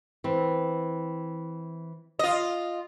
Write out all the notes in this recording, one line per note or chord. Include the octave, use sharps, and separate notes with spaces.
E3 C4
F4 D#5